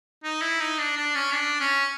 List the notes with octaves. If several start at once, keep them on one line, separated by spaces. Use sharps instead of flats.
D#4
E4
D#4
D4
D4
C#4
D4
C#4